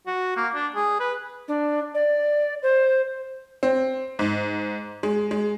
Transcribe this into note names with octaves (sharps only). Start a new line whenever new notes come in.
F#4
A#3
D4
G#4
B4
D4
D5
C5
C4
G#2
G#3
G#3